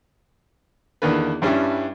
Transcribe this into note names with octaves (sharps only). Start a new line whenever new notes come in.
E2 D3 D#3 A#3 D4 B4
G2 G3 C#4 D4 E4